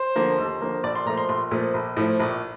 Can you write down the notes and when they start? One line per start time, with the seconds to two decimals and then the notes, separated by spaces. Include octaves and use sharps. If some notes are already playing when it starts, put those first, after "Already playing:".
Already playing: C5
0.16 D3 F3 A#3
0.38 D#2
0.61 D3 F3 A#3
0.83 A#1 D5
0.95 C6
1.06 A#2 F3 A3 A#5
1.17 C6
1.29 A#1 C6
1.51 A#2 F3 A3
1.74 A#1
1.97 A2 F3 A3
2.20 A#1